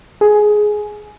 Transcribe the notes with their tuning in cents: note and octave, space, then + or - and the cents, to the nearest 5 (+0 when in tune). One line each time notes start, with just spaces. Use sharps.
G#4 +15